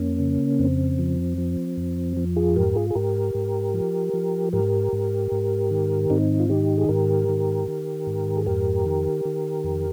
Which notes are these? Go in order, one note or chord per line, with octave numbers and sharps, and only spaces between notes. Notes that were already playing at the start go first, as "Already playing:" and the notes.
Already playing: F2 A#3 C#4
C#3
F2 C4
F3
F3
F2
F3
F4 G#4
G#2 G4 A#4
F4 G#4
G#4
G#2 G4 A#4
G#2
F3
F3
G#2 G4 A#4
G#2
G#2
D#3
G#2 C4 D#4
F4
D#3 D#4 G4
G#4
G#2 G4 A#4
D#3
D#3
G#2
G#4
F2 G4 A#4
D#3
D#3
F2